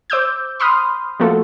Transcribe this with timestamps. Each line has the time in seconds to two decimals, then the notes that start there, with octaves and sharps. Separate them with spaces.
0.10 C5 D6 E6 G6
0.60 B5 C6 D#6 F6
1.20 F3 A3 A#3 F4 F#4 A4